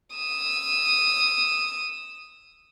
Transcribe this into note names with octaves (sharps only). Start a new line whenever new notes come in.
D#6 E6